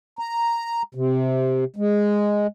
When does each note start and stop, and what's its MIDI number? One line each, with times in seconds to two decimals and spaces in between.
0.19 0.82 82
0.95 1.64 48
1.76 2.47 56